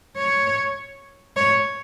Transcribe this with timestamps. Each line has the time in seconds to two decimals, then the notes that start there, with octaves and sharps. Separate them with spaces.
0.17 C#5
1.37 C#5